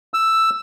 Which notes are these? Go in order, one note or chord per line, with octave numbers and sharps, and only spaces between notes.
E6